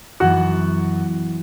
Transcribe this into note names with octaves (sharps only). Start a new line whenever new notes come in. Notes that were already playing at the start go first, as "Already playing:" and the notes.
F#2 E3 B3 F#4 F#5